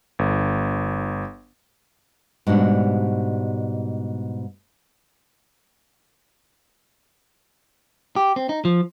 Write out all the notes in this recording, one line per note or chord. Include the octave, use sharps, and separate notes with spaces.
G1
G#2 B2 G3 D4 F#4
G4
C4
D#4
F3